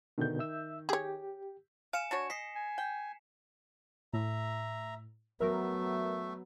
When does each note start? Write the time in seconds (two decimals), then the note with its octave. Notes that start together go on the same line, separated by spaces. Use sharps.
0.18 B2 D3 D#3 G6
0.39 E5 E6
0.89 G4 G#4 C#5
1.93 F5 G#5 C#7 E7
2.11 D4 F#4 C#5
2.30 D#5 B6 C7
2.55 G#5
2.78 G5
4.13 A2 E5 A#5
5.40 F#3 A3 B3 A#4 E5